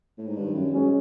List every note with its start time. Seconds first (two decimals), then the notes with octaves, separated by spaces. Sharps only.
0.18 A2
0.27 G#2
0.37 G2 D#3
0.54 F#2
0.73 F#2 G#3 C#4 F#4